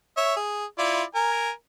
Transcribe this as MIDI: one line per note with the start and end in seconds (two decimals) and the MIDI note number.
0.17 0.34 73
0.17 0.34 76
0.36 0.65 68
0.79 1.03 64
0.79 1.03 65
0.79 1.03 74
1.15 1.50 70
1.15 1.50 80